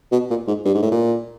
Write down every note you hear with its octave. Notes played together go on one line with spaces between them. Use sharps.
B2
A#2
G#2
G2
G#2
A2
A#2